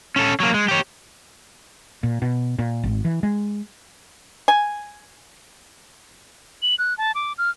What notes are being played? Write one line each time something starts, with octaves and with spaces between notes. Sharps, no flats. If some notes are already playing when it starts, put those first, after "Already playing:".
C#4 A4
F#3 A#3
G#3
G4 C#5
A#2
B2
A#2
G#1
E3
G#3
G#5
F#7
F#6
A5
D6
F6